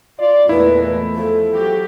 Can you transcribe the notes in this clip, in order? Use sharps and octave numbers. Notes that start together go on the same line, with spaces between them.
F4 D5
E2 A#2 G#3 A3 E4 B4
F3 A4
F#3 F#4 G4